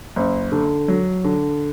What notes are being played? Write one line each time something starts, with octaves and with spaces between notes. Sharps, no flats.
F#1
D3
F#3
D3